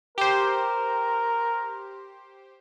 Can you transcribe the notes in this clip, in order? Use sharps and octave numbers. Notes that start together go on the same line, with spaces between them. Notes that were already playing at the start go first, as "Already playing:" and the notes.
G4 A#4 C5